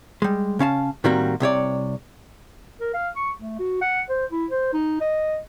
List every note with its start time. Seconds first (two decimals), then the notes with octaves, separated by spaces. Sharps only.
0.22 G3 G#3
0.59 C#3 C#4 F5 A5
1.04 A2 D#3 G3 A#3 C4 F#4
1.40 C2 C3 C#5 D5
2.81 A#4
2.94 F5
3.16 C#6
3.39 A3
3.59 F#4
3.81 F#5
4.09 C5
4.32 E4
4.51 C5
4.73 D#4
5.01 D#5